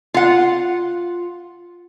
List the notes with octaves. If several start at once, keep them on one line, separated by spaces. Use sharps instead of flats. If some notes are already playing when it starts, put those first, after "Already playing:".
F4 F#5